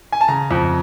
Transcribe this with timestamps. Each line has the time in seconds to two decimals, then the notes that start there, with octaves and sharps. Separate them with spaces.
0.12 G#5
0.21 A5
0.28 C#3 A#5
0.51 F2